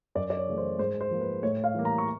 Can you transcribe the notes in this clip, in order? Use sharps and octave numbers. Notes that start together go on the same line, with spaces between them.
F#2 D5
D5
C#5
C#3 E3 A3
C5
G#2 C5
C5
F3 A#3
B4
A2 C#5
F5
E3 G3 A#3
A#5
C#6